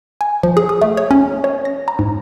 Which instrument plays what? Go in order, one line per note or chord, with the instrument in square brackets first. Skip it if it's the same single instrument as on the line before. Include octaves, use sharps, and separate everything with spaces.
[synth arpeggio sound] G#5
F3
G#4
D#6
A3
C#5
C#4
C#5
A#6
A#5
G#2